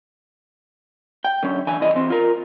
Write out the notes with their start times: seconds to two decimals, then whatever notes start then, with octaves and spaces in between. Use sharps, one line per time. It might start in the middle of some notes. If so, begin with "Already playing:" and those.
1.25 G5
1.43 D3 F#3 C#4
1.67 D3 E3 G#5
1.80 C2 G2 E3 D#5
1.94 E3 C4
2.10 F4 A#4